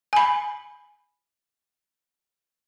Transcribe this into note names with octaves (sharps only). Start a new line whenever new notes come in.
G#5 B5